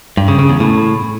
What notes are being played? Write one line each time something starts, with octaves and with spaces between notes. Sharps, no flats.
G2
C#3
C#3
E2
A2